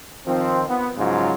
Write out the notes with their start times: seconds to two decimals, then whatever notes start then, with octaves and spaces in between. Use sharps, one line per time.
0.27 D#3 F3 C4
0.69 B3
0.98 G#2 C#3 F3 F#3 F4